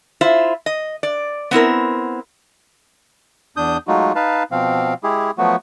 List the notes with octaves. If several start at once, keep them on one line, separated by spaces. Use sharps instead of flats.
E4 F4 C5 E5
D#5
D5
B3 C4 E4 A#4
E2 D4 D#6 G6
F#3 G#3 A3 D#4 F4 F#4
D#4 B4 F5 A5
B2 F3 C4 F5
G#3 E4 G4 G#4
F3 F#3 A3 B3 F#4